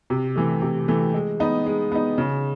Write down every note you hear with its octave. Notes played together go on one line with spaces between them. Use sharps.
C3
E3 A3
C3
E3 A3
G#3
B3 D#4
G#3
B3 D#4
C#3